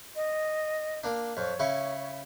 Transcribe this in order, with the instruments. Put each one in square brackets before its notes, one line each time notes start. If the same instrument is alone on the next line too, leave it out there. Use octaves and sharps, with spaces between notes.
[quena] D#5
[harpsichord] A#3 D4
[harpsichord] F2 [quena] C#5
[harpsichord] C#3 E4 C#6